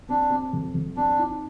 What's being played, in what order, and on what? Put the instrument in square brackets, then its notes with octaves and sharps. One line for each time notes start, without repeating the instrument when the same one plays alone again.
[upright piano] C4 [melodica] D4
[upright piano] C4
F2
F2
[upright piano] C4 [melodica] D4
[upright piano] D#4